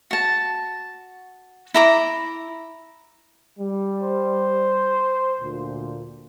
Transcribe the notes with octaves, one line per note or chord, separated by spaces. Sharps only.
F#4 A5
E4 A#5 D6
G3
C5
D2 A#2